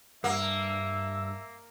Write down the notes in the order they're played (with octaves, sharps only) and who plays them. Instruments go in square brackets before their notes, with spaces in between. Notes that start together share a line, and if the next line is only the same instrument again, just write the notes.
[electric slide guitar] G2 [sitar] A#3 [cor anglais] E5 [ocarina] E6